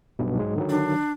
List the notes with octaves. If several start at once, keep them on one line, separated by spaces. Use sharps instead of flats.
B1 G2 B2
G#2 F#3 G#3
D3 D#3 F#3
D4